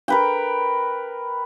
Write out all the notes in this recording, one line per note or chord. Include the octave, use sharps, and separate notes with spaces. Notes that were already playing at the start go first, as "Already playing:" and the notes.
A#4 B4 G5